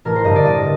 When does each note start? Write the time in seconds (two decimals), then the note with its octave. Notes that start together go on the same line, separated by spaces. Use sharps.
0.05 A1 A#4
0.16 C5
0.24 G2 D#5
0.30 D3
0.36 D5
0.45 A1 D#5